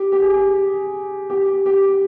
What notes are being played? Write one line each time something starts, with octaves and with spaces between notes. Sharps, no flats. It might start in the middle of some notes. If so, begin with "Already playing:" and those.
Already playing: G4
G4
G#4
G4
G4